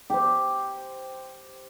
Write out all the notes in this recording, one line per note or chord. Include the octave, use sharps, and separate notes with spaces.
G4 C5